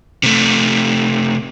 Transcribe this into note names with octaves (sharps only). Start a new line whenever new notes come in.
C3 A3